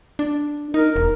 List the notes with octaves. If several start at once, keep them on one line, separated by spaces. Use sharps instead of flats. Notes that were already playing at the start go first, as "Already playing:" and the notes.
D4
D#4 A#4
E1